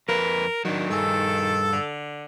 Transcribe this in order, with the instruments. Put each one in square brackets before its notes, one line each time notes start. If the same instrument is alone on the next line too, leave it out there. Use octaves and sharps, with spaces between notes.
[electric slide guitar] F2 B4 [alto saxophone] A#4
[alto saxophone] D#3 [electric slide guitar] F#3 D4
[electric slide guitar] G2 G#4 [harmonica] A4
[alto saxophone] D3